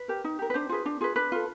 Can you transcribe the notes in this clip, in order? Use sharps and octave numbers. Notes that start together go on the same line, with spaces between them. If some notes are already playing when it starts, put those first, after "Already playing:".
Already playing: B4
G4 A#4
D#4
G4 A#4
B4
D4 C5
F4 G#4 B4
D4
F4 G#4 B4
D4 B4
F4 A4